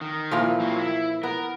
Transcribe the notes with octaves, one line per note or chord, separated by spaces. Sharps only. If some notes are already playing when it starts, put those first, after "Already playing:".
D#3
A#2 E3 F3
F#3 A#3 C4
E4
B3 A#4